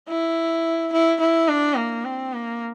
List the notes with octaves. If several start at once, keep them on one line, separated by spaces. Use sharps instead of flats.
E4
E4
E4
D4
A#3
C4
A#3